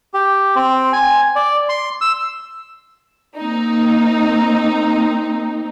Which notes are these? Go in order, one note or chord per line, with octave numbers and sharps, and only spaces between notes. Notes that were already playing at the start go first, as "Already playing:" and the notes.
G4
C4
G#5
D5
C6
E6
A#3 C4 D#4